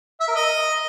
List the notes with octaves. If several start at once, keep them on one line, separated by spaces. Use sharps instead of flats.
E5
A#4
D#5